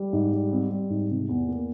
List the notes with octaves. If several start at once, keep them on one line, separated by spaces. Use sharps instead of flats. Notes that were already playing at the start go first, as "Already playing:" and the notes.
Already playing: G3
G#2
G3
C4
G3
G#2
C3
E2
A#3